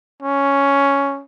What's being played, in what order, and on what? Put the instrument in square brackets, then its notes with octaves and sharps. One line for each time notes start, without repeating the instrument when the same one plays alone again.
[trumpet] C#4